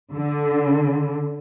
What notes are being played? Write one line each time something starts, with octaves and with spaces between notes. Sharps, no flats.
D3